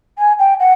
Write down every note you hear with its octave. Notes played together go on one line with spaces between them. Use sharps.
G#5
G5
F#5